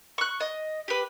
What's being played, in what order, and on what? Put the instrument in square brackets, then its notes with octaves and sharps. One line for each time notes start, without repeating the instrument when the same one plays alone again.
[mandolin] C#6 F#6
D#5
G4 B4